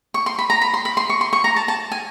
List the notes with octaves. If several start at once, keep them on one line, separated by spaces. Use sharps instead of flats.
C#6
C6
B5
A#5
B5
C6
B5
C6
C#6
C6
C#6
A#5
A5
A5
G#5